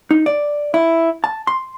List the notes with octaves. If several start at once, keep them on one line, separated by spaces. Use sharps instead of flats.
D#4
D5
E4
A5
C6